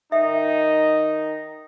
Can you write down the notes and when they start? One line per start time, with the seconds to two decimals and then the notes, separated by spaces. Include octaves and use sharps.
0.12 D#3 D#4 E5